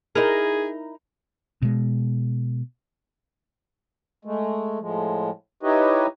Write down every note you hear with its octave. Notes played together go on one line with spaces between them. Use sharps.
D#4 E4 G#4 A#4
B2 G#3
G#3 A3
A2 F3 G#3
D#4 E4 G4 B4 C#5 D#5